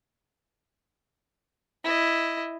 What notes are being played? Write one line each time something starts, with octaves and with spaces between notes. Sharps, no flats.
E4 D#5